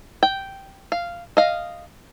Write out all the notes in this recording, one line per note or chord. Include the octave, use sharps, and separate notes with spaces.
G5
F5
D#5 F5